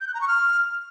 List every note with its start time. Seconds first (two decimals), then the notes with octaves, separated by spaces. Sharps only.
0.01 G6
0.07 F#6
0.14 A#5
0.21 C#6
0.28 F6